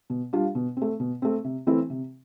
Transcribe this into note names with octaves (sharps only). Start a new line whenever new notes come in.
B2
G3 D4 F4
B2
A3 C4
B2
A3 C4
C3
E3 A3 C4 E4
C3